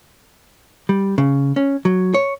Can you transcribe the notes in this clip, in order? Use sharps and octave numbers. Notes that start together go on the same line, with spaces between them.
G3
C#3
C#4
F#3
C#5